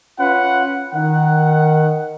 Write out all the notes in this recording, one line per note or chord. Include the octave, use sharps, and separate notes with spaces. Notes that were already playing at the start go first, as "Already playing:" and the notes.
C#4 F4 B4 F#5
D#3 F#5